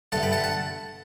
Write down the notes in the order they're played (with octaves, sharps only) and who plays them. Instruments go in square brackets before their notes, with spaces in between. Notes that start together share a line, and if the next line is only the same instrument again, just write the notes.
[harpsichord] G2 D3 A3 F#5 A5
G5 B5
F#5 A5
F#5 A5